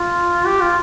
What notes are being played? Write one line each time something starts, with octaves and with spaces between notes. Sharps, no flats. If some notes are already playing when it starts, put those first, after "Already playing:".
Already playing: F4
G4
F4